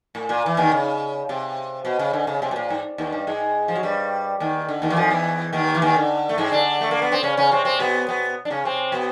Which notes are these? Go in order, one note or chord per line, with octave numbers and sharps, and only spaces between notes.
A2
A#2
E3
D#2 D#3
C#3
C3
B2
C#3
D3
C#3
C3
B2
A#2
G#2
D#2 D#3
G2 G3
G#2 G#3
F3
F#3
G2 G3
D#2 D#3
D3
D#2 D#3
E3
F2 F3
E2 E3
D#2 D#3
E3
D#2 D#3
D3
A3
G#2 G#3
D3 D4
A3
A#3
B3
C4
C#3 C#4
C#3 C#4
C3 C4
C3 C4
B2 B3
B2 B3
D4
C#3 C#4
C3 C4
B2 B3